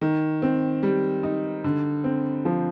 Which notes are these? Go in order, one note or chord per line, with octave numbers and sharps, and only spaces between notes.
D#3
C4
G3
D#4
D3
C4
F3